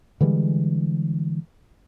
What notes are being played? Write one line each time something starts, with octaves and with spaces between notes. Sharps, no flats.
D3 E3 G3 G#3